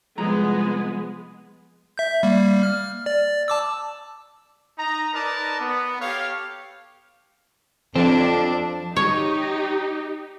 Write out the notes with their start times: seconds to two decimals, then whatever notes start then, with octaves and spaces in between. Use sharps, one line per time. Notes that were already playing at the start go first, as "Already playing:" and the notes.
0.18 C2 F3 G#3 B3 A#5
1.98 E5 G6
2.23 G3 A#3
2.63 F6
3.06 D5
3.48 A5 D6 E6
4.79 D#4 A#5
5.14 D#4 A#4 B4 D5 A5 A#5
5.60 B3
6.01 G4 A4 C#5 F5
7.96 F2 F3 C4 D4
8.96 D#4 G4 C#5